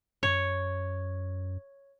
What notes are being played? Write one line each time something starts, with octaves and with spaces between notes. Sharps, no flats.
F#2 C#5